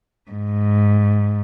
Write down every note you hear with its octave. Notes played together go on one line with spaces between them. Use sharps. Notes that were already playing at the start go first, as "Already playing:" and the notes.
G#2